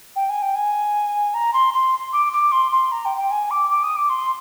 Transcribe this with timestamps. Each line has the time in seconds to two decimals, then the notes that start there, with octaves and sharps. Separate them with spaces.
0.16 G5
0.29 G#5
0.42 G5
0.55 G#5
1.34 A#5
1.54 C6
1.74 C6
2.13 D6
2.33 D6
2.52 C6
2.72 C6
2.92 A#5
3.05 G5
3.18 G5
3.31 G#5
3.51 D6
3.70 D6
3.83 D#6
3.96 D6
4.10 C6